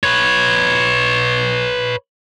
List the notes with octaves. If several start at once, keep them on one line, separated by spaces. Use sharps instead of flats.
B4 C#5